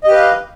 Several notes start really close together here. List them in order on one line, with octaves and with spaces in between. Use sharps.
D#5 G4 B4 F5